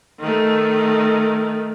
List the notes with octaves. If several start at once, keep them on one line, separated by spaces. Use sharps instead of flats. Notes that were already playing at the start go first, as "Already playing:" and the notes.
D#3 A3